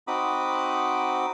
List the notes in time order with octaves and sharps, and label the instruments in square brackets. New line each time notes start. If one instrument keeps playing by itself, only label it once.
[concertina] C4 D#4 F#4 B5 D6 D#6